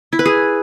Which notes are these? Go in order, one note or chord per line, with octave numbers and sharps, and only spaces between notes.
E4
B4
G#4